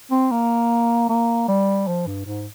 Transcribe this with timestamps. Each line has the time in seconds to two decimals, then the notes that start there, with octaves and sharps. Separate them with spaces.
0.12 C4
0.32 A#3
1.10 A#3
1.49 G3
1.87 F3
2.07 G2
2.26 G#2